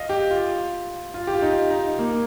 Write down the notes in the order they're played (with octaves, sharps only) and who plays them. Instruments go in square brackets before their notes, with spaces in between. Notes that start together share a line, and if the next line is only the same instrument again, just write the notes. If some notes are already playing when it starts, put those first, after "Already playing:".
Already playing: [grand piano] D#5 F5
G4
F4
F4
G4
F4
D#4
D#4
A#3